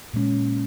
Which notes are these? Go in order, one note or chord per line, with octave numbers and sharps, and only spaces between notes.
A#2 G#3 C#4